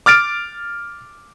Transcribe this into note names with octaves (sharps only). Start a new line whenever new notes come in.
D6 F6 A6 D7